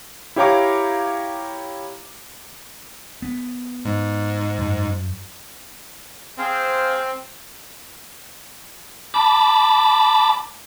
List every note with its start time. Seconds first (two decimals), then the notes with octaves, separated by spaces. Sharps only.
0.36 E4 G4 C#5 F5 A#5 D6
3.22 B3
3.85 G#2
4.58 F#2
6.39 C4 G#4 C5 F5
9.14 A5 B5 D6